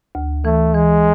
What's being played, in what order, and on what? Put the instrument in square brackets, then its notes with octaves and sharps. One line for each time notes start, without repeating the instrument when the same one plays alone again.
[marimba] D2
[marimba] E3 [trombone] A3
[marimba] E3 [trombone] G#3